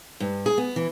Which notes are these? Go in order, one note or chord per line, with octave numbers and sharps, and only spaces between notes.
G2
G#4
B3
E3